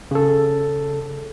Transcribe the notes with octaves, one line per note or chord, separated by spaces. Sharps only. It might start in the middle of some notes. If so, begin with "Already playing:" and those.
C#3 A4